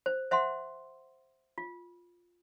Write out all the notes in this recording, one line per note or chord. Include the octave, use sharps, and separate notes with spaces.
C5
C5 E5 F#5 C6
F4